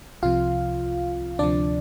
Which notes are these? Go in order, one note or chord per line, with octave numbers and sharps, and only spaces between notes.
C2 C3 F3 F4 F5
D2 C3 F3 D4 D5